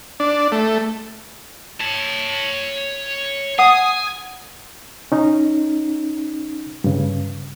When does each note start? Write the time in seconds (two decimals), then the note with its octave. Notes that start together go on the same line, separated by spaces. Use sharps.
0.20 D4
0.52 A3
1.81 C#5 A5
3.59 F#5 G#5 D#6
5.12 C#4 D#4
6.84 G2 C#3